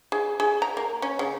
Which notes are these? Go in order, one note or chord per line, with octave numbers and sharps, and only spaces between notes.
G#4
G#4
A#5
A#3
C#4
C#3